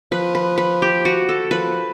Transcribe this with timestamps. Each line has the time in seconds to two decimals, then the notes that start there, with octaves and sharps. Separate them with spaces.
0.12 F3 B4
0.35 B4
0.58 B4
0.82 G4
1.05 F#4
1.29 A4
1.51 F3 B4